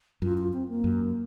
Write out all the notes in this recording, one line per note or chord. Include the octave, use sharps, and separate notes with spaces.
F#2 F4
F4
C4
A#3
F#2